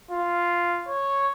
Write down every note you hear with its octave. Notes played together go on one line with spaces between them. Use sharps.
F4
C#5